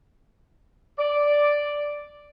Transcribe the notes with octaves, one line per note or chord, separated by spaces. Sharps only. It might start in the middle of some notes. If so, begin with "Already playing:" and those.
D5